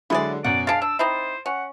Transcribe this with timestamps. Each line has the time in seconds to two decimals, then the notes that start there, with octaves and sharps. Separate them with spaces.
0.10 D3 F#3 G#3 E4 G#4 D5
0.44 F#2 B2 D5 F#5
0.67 G#3 D4 F5 A6 D7
0.82 D4 E6
0.99 C4 D#4 E4 C5
1.46 C#4 F#5